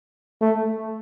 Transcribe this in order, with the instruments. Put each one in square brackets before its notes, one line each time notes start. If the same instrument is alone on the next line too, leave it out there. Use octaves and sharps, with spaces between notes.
[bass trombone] A3